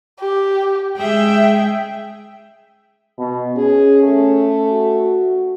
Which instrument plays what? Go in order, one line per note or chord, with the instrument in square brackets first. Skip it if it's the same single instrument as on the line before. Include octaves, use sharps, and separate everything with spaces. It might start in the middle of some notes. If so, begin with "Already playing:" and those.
[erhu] G4
[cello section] G#3 G#4 E5 [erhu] G5
[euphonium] B2
[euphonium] C#4 [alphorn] G#4
[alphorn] A3
[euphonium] F#4